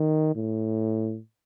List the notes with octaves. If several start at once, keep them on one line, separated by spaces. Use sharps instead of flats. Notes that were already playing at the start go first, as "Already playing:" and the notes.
Already playing: D#3
A2